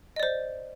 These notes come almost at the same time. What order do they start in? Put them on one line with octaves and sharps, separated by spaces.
D#5 D5 C5